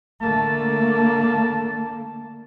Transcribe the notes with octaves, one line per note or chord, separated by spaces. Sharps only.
D3 A3 A#3 A5